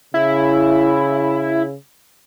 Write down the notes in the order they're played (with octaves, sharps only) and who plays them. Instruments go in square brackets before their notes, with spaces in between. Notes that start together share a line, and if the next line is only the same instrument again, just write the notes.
[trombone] C#3 [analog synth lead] E4